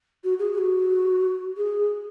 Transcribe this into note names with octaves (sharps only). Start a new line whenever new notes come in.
F#4
G#4
G#4
F#4
G#4